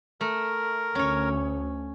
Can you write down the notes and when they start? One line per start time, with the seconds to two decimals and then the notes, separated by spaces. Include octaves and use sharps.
0.21 A3 A#4
0.95 D2 C#4 C#5